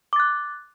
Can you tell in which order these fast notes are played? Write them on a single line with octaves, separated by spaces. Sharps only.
D6 A6 F#6